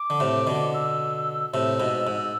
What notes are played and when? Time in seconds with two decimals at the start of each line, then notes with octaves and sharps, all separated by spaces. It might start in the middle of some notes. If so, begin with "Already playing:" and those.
Already playing: D6
0.10 D3
0.20 A2 C3
0.47 B2 D3
0.74 E6
1.53 A2 C3 E6
1.80 G#2 B2
2.07 G#2